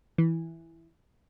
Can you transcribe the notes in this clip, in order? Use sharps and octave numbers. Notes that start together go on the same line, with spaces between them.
E3